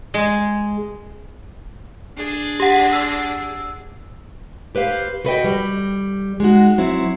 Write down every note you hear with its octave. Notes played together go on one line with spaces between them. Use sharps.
G#3
D4 G#4
G4 F#5
E6
G4 B4 C5 F5
F#4 A4 B4 D5 D#5 G5
G3
G#3 D#4 F#4
F#3 C4 E4